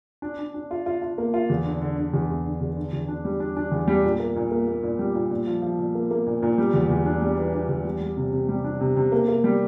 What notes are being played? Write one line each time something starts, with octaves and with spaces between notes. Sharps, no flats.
D4
D4
D4
F4
F4
F4
A#3
F4
E2
D3
D3
D3
E2
E2
D3
E2
D3
E2
D4
G3
D4
D4
E2
G3
A#2
A#3
A#2
A#3
A#3
A#2
G3
A#2
A#2
F3
F3
A#2
A#3
A#3
A#2
A#2
G3
E2
E2
D4
G3
E3
D4
E2
G3
G3
C3
C3
G3
D4
C3
C3
A#3
A#3
G3